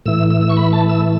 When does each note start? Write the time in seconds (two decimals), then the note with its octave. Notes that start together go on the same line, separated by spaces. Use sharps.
0.06 A2 E3 E6
0.30 E6
0.41 E6
0.49 C#6
0.57 B5
0.73 A5
0.89 E6